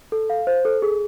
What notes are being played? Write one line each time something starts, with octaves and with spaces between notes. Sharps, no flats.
A4
F5
C5
A4
G#4